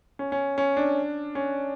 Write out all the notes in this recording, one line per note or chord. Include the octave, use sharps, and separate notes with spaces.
C#4
C#4
C#4
D4
C#4